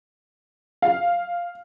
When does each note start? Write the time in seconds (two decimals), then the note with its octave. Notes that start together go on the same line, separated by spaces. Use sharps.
0.82 F5